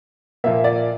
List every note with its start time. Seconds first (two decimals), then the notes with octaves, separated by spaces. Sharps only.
0.44 A#2 F3 A#3 E5
0.64 D5